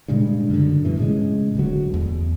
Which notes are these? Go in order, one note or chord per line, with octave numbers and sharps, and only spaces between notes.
G2 A#2 C#3 G#3
F#2 D3
G2 B2 E3
A2 C#3 G#3
D1 D2 F#3
E2